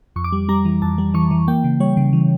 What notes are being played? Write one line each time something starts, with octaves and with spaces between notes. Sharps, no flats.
F2 C#6
D6
G3
G3 A#5
E3
F2 A5
G3
E3 C#6
E3
A#3 G5
C#3
G3 C#5
C#3
E3